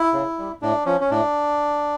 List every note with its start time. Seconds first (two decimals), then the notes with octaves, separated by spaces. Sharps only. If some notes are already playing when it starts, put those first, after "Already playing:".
Already playing: E4
0.13 C#3
0.38 G3
0.62 A2 D4
0.86 F3 C#4
1.01 C#4
1.11 A2 D4